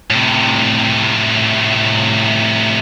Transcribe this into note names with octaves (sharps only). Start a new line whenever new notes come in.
A2 C3